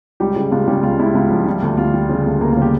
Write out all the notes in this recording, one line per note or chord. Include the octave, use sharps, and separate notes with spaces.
C#2 G3 G4
C#3
C#2 F4
C#3 G3 G4
C#2 F4
C#2 E4
C#2 F4
F3
G3
D2
G3 F4
G3
C#3
D2
D2 A#3 A#4
F4
C#3
G3 G4